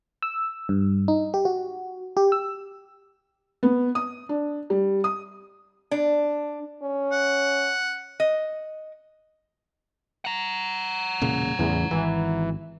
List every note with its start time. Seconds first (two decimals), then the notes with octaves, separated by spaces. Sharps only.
0.22 E6
0.69 G2
1.08 D#4
1.34 G4
1.45 F#4
2.17 G4
2.32 E6
3.63 B3
3.95 D#6
4.29 D4
4.70 G3
5.04 D#6
5.91 D4
6.83 C#4
7.12 F#5
8.20 D#5
10.25 F#5 A#5
11.21 E1 A#2 C#3
11.59 E2 A2 C#3 E3
11.91 G#1 E3